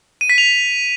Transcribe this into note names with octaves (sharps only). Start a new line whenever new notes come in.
D#7
B6
F7